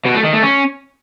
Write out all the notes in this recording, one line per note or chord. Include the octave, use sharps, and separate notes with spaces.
B2
A3
D#3
A3
C#4